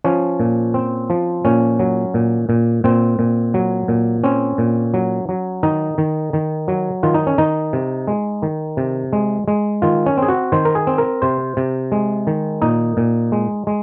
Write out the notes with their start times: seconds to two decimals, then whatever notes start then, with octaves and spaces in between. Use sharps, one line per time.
0.04 F3 C#4
0.40 A#2
0.74 C4
1.10 F3
1.45 A#2 C#4
1.79 F#3
2.14 A#2
2.49 A#2
2.84 A#2 C4
3.19 A#2
3.54 F#3
3.88 A#2
4.24 C4 C#4
4.58 A#2
4.94 F#3
5.29 F#3
5.63 D#3 D#4
5.98 D#3
6.33 D#3
6.68 F#3
7.03 D#3 F4
7.14 D#4
7.27 C#4
7.38 D#3 D#4
7.73 C3
8.08 G#3
8.42 D#3
8.77 C3
9.13 G#3
9.48 G#3
9.82 D#3 F4
10.06 C#4
10.17 C4 G#4
10.28 F#4
10.52 D#3 C5
10.65 A#4
10.75 G#4
10.87 C4
10.98 A#4
11.22 C3 C5
11.57 C3
11.92 G#3
12.27 D#3
12.62 A#2 D#4
12.97 A#2
13.32 G#3
13.67 G#3